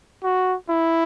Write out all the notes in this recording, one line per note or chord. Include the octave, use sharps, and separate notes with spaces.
F#4
E4